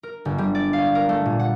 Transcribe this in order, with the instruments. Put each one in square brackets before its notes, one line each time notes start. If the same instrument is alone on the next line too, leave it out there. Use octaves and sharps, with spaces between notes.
[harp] A#4
G1
G3
D5
F5
A#4
A3
A#2
F#5